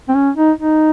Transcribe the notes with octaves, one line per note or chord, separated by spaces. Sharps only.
C4
C#4
D#4
D#4